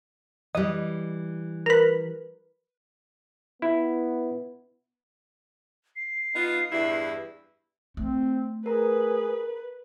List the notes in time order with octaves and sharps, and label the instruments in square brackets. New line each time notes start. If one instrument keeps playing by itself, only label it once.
[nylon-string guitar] E3 G3 [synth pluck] D#5
[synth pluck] A#4 B4
[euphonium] B3 [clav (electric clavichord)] E4
[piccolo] C7
[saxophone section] B3 D#4 F4
E2 G2 E4
[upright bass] A3 [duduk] C4
[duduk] G#4 [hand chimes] A#4 A#5 [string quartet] B4